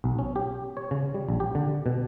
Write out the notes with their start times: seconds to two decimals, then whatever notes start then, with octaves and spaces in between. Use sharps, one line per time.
0.04 B1
0.19 C#4
0.36 G4
0.77 C#5
0.91 C#3
1.14 G3
1.28 A#1
1.40 G4
1.55 D3
1.86 B2